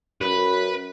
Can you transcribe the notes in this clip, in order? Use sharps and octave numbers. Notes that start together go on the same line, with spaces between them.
F#2 B4